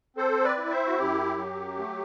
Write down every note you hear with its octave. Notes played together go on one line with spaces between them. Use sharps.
C4 A4 C5
B4 D5
E4
C5 E5
F#4
F#2 G4
F#3
A3